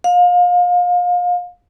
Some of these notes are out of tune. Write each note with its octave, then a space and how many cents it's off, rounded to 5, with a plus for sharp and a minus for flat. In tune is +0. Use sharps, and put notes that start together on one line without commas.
F5 +30